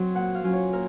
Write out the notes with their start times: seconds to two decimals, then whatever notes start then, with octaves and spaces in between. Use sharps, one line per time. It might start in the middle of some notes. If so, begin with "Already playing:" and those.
Already playing: F#3 C4
0.15 A#2 F#5
0.35 F5
0.44 F#3 C#4 F4
0.53 C#5
0.73 A#2 A#4